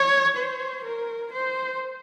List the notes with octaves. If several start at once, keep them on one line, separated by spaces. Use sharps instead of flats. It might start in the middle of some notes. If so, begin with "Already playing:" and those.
Already playing: C#5
C5
A#4
C5